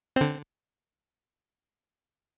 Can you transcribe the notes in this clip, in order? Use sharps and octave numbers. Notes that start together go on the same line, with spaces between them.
D3 C4